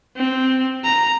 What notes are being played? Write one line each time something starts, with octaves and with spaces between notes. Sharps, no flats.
C4
A#5